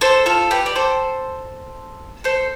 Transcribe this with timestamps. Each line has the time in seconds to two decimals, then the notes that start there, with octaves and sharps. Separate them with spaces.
0.01 A4 C5
0.26 F4 A4
0.51 G4 B4
0.66 D5
0.76 A4 C5
2.24 A4 C5